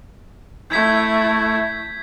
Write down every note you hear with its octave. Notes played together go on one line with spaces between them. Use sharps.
A3 E4 G6 G#6 B6